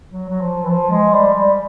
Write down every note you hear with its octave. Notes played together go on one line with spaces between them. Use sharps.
F#3
F#3
F3
E3
F3
G#3
G3
G3